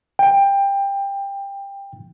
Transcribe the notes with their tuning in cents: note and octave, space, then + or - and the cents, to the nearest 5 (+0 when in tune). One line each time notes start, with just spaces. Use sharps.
G5 +20